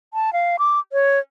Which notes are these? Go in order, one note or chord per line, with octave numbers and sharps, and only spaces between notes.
A5
F5
D6
C#5